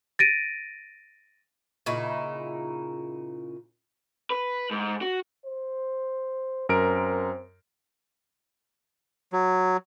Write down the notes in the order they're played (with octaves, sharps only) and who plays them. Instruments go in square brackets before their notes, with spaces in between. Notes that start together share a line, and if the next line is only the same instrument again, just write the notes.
[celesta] A6 A#6 D7 D#7
[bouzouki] A#2 C#3 D#4 E4
[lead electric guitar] B4
G#2
F#4
[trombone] C5
[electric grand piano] F#2 A#4 D7 [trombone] C4
[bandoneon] F#3